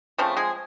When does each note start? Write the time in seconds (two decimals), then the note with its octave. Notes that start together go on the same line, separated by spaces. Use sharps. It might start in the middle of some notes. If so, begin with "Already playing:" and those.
0.18 C#3 F3 A3 C4
0.37 G#3 G#4